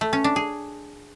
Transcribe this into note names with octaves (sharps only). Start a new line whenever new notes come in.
A3
C#4
D4
G#4